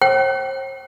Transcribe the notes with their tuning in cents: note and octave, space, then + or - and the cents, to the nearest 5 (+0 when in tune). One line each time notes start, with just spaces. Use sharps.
C5 +40 G5 -35